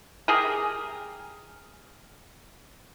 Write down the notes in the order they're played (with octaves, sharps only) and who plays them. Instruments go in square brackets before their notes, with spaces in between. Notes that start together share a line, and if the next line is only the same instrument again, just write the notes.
[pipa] G4 G#4 A#4